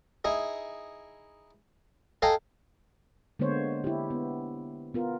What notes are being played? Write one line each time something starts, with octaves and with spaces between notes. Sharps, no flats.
D#4 E4 G#4
A4 D#5 F5 G5 G#5 A#5
D3 G#3 A#3 B3 C5 C#5
E4 G4
B3
B3 F4 A#4